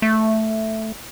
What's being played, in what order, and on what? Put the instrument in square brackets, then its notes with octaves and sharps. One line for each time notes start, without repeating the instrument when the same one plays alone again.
[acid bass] A3